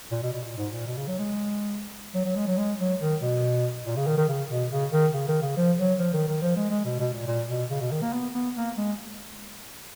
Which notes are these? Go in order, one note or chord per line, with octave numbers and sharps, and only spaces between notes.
A#2
B2
B2
A#2
G#2
A#2
B2
C#3
F#3
G#3
F#3
F#3
G#3
F#3
G#3
F#3
D#3
B2
A#2
C#3
D#3
D#3
C#3
B2
C#3
D#3
C#3
D#3
C#3
F3
F#3
F3
D#3
D#3
F3
G#3
G#3
B2
B2
A#2
A#2
B2
C#3
B2
D#3
A#3
B3
B3
A#3
G#3